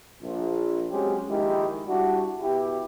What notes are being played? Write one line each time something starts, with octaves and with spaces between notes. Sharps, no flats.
A#1
F#3 G#3 C4 C#4 G4
A#1 D#3 G#3 E4 G4
G3 D4 E4 F#4
B2 E4 G4